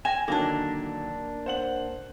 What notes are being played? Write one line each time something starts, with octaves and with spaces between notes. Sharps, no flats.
G#5 A#6 E7
D3 D#3 F#3 A#3 D4
C5 F#5 F#7